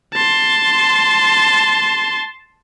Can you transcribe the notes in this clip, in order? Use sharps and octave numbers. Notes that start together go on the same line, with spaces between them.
A5 C6